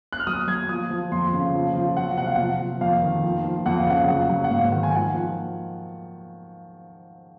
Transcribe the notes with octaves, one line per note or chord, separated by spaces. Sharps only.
F#6
F6
F#3 D#6
F#3 G#6
F3 D#6
F3
F2 C6
C#3
F3
F3
F#3 F#5
C3 F#5
F5
F3 F#5
F3
F2 F5
D#3
F3
F3
F2 F#5
F5
C#3 F#5
F#3 F#5
F#3
F#5
G#2 F5
D#3 F#5
G#5
F3 F#5
F3